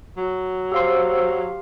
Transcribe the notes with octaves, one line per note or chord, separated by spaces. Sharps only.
F#3
G4 C5 F5 C6 E6